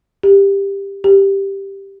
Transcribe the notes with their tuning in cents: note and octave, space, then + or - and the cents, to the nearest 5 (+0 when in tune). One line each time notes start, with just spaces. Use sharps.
G4 +15
G4 +0